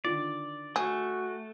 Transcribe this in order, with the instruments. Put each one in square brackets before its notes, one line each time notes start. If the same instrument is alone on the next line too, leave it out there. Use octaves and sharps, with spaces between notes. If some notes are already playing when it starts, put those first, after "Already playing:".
[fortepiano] D3 D#3 F4 [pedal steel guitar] D5
[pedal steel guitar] A3 [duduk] F#4 [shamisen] G#4